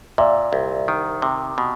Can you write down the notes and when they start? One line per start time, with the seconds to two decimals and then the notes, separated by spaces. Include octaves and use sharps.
0.18 A#2 D5 E5
0.53 C2
0.88 D#3
1.22 C3
1.58 B2